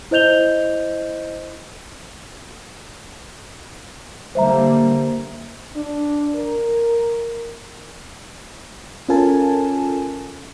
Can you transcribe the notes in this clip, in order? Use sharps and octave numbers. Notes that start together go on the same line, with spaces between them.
E4 C5 D#5 G6 F7 G7
D3 G3 A#3 C5 E5 A#5
D4
A#4
C#4 F4 A4 A#4 G#5 A5